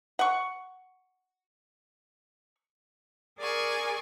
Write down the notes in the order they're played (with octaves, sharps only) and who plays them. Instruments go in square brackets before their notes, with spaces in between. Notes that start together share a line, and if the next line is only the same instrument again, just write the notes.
[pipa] F#5 C#6
[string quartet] G#4 A#4 D5 G#5 C#6